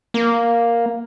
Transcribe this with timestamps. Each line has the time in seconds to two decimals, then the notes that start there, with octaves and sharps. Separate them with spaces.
0.14 A#3